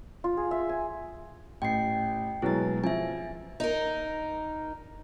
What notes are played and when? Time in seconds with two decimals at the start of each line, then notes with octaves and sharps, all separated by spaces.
0.24 F4
0.37 G#4
0.51 E5
0.69 G#5
1.62 A1 G5 C7
2.42 B2 F#3 G#3 E4 A6
2.84 F3 E5 G#5
3.60 D#4 A#4